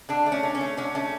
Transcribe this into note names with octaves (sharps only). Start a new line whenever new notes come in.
D3 D4
A3
C#4
D3
C#4
A3
D3 C#4
A3 C#4